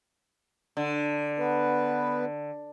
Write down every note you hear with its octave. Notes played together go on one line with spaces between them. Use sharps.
D3
B3 B4